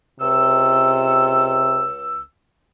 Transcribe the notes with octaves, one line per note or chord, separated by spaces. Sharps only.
C#2 C3 E6